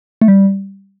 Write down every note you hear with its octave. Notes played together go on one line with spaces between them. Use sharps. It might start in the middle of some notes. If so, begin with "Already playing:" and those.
A3
G3